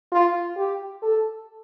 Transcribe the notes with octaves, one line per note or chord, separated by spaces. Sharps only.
F4
G4
A4